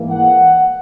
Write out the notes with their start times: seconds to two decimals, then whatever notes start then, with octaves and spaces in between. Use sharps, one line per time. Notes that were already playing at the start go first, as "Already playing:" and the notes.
Already playing: G#2 E3 A#3
0.10 F#5